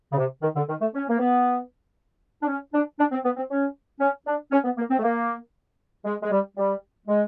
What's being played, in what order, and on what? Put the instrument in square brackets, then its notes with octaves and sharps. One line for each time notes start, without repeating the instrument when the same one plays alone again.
[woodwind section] C#3
C3
D#3
D3
D#3
A3
C#4
A#3
B3
D4
C#4
D4
D4
C4
B3
C4
C#4
C#4
D4
C#4
B3
A#3
C4
A3
A#3
G#3
G#3
G3
G3
G#3